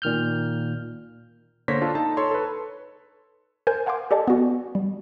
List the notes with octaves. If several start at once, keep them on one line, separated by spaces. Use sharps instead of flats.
A#2 D#3 F6 G6
D3 A#3 C5 C#5 A#6 B6
D4 F4 A4
D#4 A5
A4 C#5 C6
A4 B4
A#4 C5 G#5 G6
F5 F#5 G#5 C6 D6
G4 A4 D5 D#5 G#5 A5
B3 F#4
G3